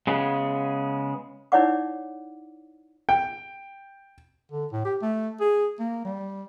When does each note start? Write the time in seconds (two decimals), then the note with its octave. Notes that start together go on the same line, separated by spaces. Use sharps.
0.07 C#3 G#3 B3
1.52 D#4 E4 C#5 D5 F#5 D6
3.09 G5
4.52 D3
4.72 A2
4.85 G4
5.02 A3
5.41 G#4
5.79 A#3
6.05 G3